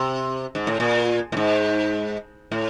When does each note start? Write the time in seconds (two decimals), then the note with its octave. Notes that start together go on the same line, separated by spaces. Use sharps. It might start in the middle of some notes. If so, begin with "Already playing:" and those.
Already playing: C3
0.55 G#2
0.67 A2
0.80 A#2
1.32 A2
1.37 G#2
2.51 A2